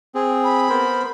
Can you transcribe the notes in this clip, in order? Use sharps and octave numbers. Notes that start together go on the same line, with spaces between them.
C4 G#4
B5
B3 A#4 C5